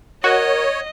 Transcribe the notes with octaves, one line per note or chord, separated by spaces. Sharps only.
F#4 A#4 C#5 D#5